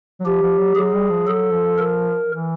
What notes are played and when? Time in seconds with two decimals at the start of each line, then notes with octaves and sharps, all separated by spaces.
0.20 F#3
0.25 F3 G4
0.42 F3
0.59 F#3
0.75 F#3 G#4
0.93 G3
1.10 F3
1.27 F#3 A4
1.53 F3
1.78 A#4
2.29 E3